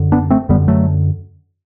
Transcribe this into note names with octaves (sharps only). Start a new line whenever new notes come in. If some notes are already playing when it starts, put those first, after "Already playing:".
Already playing: F#2 D3
B3 D4
A3 C4
F#2 D3 G3 B3
F#3 A3